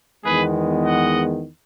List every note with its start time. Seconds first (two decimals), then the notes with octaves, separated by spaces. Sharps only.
0.24 E2 D#3 G#3 B3 G#4 B4
0.85 D#5 F#5